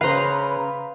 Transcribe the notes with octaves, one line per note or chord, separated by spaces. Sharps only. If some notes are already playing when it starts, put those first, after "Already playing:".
C#3 B4 C5 F5 A#5